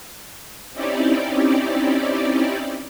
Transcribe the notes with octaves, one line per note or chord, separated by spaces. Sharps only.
C4 C#4 D#4 E4 G4 D5